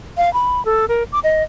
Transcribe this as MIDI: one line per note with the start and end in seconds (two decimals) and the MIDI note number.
0.17 0.32 77
0.34 0.64 83
0.65 0.86 69
0.88 1.03 70
1.12 1.19 86
1.24 1.43 75